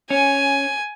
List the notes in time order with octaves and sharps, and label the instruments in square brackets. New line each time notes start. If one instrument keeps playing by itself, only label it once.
[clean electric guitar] C#4 [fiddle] G#5